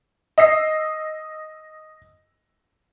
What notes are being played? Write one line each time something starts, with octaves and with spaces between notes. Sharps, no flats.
D#5 E6 C7